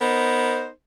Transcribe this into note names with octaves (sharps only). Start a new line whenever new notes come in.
B3 D#4 A#4 C5